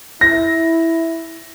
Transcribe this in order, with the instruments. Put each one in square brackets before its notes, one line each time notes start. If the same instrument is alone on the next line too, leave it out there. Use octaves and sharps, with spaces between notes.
[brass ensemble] E4 [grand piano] A#6